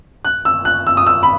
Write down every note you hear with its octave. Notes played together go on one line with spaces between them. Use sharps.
F#6
E6
F#6
E6
D#6
E6
B5